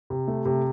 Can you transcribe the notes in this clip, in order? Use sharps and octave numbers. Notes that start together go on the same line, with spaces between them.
C3
A3
C3